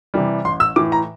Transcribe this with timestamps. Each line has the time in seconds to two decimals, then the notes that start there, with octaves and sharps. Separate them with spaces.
0.14 C3 E3 G3
0.45 A1 C6
0.60 E6
0.76 A2 E3 D6
0.92 A#5